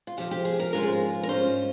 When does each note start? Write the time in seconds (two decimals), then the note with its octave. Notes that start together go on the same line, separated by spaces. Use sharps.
0.07 F4
0.17 F2 C3 F3 G4
0.31 G4
0.45 G#4
0.60 A#4
0.73 G#2 F3 G#3 C#4 F4 A#4
0.83 G#4
0.92 A#4
1.23 A#4
1.29 G#2 G3 C#4 F4 C5